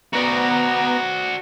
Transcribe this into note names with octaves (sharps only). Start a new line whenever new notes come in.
B3 F#4 D5 A#5